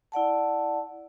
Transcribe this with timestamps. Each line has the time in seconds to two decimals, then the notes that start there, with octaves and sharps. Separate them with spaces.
0.12 E4 D5 F#5 A5